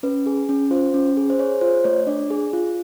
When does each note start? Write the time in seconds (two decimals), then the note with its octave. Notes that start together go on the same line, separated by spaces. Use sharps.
0.03 C#4 B4
0.26 G#4
0.49 C#4
0.71 F4 C5
0.94 C#4
1.17 G#4
1.30 C5
1.39 G#4 C#5
1.61 F4 C5
1.84 A3 C#5
2.07 D4 D5
2.30 G#4
2.53 F4